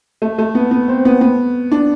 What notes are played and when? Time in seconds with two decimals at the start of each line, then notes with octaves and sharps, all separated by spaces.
0.22 A3
0.38 A3
0.55 B3
0.71 B3
0.88 C4
1.05 B3
1.21 B3
1.72 D4